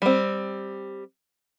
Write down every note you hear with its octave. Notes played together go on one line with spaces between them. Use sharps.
G3 C4